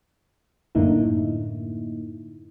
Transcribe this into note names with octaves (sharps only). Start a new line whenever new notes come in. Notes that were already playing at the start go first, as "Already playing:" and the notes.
F#2 A2 D3 A#3 D#4 E4